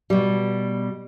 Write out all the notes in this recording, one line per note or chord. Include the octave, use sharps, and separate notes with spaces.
B2 G3